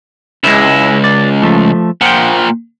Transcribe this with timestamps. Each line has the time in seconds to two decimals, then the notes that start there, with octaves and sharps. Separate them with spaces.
0.44 C#2 G#3 E4
1.04 D5
1.42 F3 A3
2.01 A#2 F3 F#5 G5